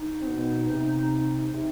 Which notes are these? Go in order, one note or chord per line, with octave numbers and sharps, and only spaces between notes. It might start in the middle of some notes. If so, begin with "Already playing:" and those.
Already playing: D#4
C3
B2
C3
C3 D#4